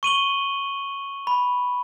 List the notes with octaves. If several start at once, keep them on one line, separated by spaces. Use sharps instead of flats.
C#6 D#7 F#7 G7
B5